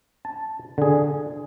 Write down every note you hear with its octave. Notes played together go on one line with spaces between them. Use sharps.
A5
D3 G#4